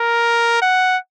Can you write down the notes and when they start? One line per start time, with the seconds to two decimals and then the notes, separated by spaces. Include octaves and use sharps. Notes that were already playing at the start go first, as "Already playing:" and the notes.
Already playing: A#4
0.62 F#5